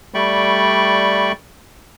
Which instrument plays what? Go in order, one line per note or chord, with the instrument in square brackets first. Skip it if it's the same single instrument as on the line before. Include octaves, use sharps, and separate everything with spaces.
[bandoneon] G3 A3 D5 G5 B5 C#6